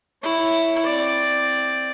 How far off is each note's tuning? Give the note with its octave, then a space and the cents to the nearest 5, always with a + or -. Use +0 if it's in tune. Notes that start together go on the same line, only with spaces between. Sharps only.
E4 +0 C#5 +0
C4 +0 D5 +0